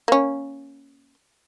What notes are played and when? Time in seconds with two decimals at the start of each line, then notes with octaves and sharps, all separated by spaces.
0.08 A#3 C#4